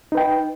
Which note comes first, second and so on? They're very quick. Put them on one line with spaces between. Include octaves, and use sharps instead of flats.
D#4 B4 G5